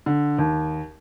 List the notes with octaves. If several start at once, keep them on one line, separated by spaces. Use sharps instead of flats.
D3
D#2